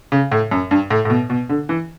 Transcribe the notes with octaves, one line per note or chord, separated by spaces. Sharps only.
C#3
A2
F#2
G2
A2
A2
B2
B2
D3
E3